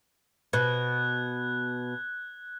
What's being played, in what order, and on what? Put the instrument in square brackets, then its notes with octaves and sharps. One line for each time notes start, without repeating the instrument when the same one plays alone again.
[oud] B2 [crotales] F#6 G#6